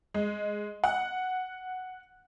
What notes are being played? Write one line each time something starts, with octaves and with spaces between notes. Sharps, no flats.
G#3
F#5